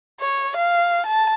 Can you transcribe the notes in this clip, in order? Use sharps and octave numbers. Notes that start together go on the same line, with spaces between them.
C#5
F5
A5